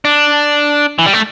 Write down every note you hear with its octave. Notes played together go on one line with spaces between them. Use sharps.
D4
E3
G3
A3